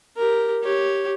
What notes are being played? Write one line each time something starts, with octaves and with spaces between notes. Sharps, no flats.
G4 A#4
G4 C#5